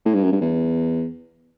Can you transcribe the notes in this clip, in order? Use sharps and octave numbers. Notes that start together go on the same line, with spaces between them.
A2
G2
F#2
G2
E2